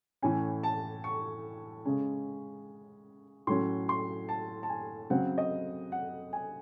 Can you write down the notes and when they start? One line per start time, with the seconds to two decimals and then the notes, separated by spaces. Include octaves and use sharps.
0.22 A2 E3 A3 C#4 G#5
0.64 A5
1.04 C#6
1.85 C#3 G#3 C#4
3.47 A2 F#3 C#4 C6
3.89 C6
4.29 A5
4.63 A5
4.70 G#5
5.10 C#3 F#3 C4 F#5
5.38 D#5
5.92 F#5
6.33 G#5